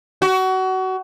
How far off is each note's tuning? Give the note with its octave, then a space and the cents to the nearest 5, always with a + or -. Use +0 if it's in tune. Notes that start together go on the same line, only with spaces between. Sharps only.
F#4 +25